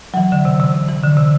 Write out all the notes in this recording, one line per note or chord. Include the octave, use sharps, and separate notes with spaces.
F#3
E3
D3
C3
C3
C3
E3
D3
C3